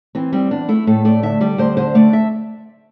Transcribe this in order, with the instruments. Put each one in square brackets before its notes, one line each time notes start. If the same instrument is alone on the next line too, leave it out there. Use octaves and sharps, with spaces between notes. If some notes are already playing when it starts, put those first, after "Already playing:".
[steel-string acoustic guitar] E3 C4
G3 C4
E2 D4
A3 E4
A2 A4
A3 D5
D3 E5
G3 D5
D2 C5
D3 C5
A3 D5
E5